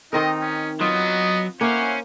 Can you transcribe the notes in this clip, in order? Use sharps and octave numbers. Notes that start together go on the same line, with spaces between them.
D#3 C4 D#4 A#4 D#5
C#4
F#3 B3 F4 D#5
A#3 C#4 E4 C5 C#5 F#5